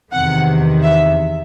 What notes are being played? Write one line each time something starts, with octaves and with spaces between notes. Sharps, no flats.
E2 C3 D#3 F#5
E5